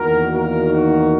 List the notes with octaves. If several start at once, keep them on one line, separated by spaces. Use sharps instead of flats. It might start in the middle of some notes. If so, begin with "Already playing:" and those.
Already playing: E2 D#3 A#3 F#4 A#4
F#4 A#4
D#4 F#4